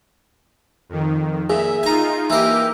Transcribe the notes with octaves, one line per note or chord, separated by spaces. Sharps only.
F2 D#3
A#2 G#4 E5
D#4 F4 G#5 A#5
E3 A#3 G4 A#4 D#5